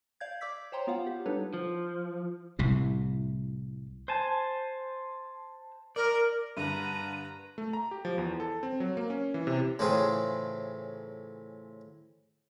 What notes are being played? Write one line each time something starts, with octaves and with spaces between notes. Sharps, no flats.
D5 F5 G6 G#6
D5 D6 E6 B6
C5 C#5 G5 A#5 C6
B3 F4 F5 F#5
G4
G3 D4 D#4 A4 B4 C#5
F3
C2 A2 C3
C5 G#5 A5
A#4 D5
G2 D3 B4 A#5 D#7
A3
A#5
G4
F3
E2
A4
C4
F#3
A#3
C#4
E3
C3
A2 C#3 E3 C4 F4 G#4